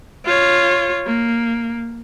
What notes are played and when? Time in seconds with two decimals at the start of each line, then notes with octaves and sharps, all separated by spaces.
0.25 F4 C#5
1.06 A#3